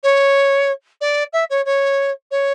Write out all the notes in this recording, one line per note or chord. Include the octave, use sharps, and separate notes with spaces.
C#5
D5
E5
C#5
C#5
C#5